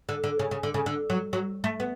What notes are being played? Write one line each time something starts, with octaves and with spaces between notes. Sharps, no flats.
D3
D3
C#3
C#3
D3
C#3
D3
F#3
F#3
A3
B3